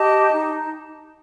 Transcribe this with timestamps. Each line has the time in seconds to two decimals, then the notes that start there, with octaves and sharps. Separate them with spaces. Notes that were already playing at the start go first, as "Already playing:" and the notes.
Already playing: G4 D#5 A5
0.30 D#4